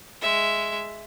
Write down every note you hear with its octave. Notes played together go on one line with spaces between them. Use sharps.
G#3 E5